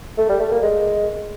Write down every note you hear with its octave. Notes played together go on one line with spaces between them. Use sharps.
A3
G3
A3
A#3
G#3